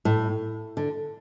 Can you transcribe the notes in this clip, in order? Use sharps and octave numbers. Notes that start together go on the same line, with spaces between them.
A2
D3